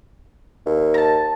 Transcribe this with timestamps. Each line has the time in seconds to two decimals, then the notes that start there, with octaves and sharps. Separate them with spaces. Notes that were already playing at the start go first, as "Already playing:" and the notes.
0.66 D#2
0.94 A5 A#5